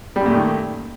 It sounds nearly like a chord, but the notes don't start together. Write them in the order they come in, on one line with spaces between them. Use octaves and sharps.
G3 F#2 A#2 A3 D#3